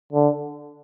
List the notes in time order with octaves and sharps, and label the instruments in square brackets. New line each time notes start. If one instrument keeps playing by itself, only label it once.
[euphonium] D3